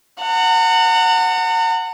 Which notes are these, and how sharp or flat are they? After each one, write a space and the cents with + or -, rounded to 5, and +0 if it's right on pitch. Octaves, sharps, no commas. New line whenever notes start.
F#5 +0 A#5 -45